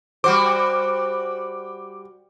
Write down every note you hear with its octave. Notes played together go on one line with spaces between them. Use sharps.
G3 F#4 C5 D6